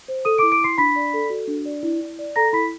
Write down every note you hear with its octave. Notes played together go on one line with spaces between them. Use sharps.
C5
A4 D#6 D#7
D6 D7
E4
D6 D7
E4 C6 C7
D4 B5 B6
D5
A4
F#4
D4
D5
E4
E4
D5
A4 A#5 A#6
E4 B5 B6